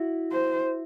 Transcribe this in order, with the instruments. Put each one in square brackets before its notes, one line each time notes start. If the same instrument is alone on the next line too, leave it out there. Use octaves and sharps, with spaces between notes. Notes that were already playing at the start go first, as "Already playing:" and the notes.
Already playing: [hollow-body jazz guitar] E4 F#4
[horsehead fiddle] C5